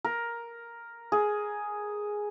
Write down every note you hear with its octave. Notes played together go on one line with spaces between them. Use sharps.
A#4
G#4